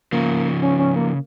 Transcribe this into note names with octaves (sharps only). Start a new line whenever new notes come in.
C#3 F3 A#3
C#4
C#4
A#3